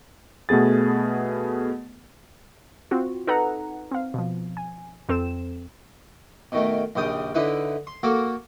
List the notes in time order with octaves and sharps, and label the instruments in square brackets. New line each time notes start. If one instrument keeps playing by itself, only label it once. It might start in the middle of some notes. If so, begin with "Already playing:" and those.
[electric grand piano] B2 A3 B3 G#4 A6
[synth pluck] C4 F4 F#4
D#4 A4 B4 F#5 A#5
C4 F5
B2 F3
G#5
F2 C4 A4 E7
[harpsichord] B2 D#3 A3
A#1 D#2 C#3 G5 D#6
D3 D#4 E4 B4
C6
A#3 F#4 A4 A#4